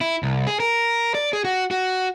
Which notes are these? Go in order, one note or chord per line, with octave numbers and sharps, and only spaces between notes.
E4
C2
G#4
A#4
D5
G#4
F#4
F#4